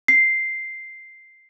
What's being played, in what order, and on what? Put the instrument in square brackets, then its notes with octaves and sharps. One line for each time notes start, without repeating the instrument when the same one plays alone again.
[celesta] C7